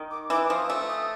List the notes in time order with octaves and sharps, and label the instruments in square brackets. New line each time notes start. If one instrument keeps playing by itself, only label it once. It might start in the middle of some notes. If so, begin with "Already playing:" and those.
Already playing: [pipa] D#3
[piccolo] D6
[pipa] E3 [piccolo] D6
[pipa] F3 [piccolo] D#6
[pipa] A3 [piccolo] E6
[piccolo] D#6